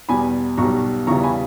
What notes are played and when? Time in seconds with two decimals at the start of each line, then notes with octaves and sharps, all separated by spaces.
0.09 E2 B2 G3 G#5 B5
0.57 B1 A#5 C#6
0.61 B2 G3
1.07 E2 C#3 E3 G3 A#5 C#6
1.24 G#5 B5